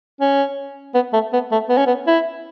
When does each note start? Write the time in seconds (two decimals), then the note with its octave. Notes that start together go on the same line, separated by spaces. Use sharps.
0.20 C#4
0.94 B3
1.13 A3
1.33 B3
1.51 A3
1.69 B3
1.77 C#4
1.86 B3
2.07 E4